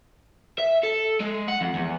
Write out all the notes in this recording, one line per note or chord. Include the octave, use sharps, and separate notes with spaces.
E5
A4
G#3
F#5
F2
E2